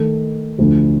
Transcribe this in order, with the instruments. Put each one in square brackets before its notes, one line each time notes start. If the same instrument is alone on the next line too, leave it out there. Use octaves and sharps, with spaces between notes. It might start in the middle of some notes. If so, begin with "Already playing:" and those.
Already playing: [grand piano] D#3 A3 D#4 A4
D2 D3 F3